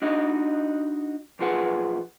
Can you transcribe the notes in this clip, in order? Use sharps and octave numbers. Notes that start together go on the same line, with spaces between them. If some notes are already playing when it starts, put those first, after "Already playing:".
D4 D#4 F#4 D#5
B1 F2 F3 G#4 B4 F#5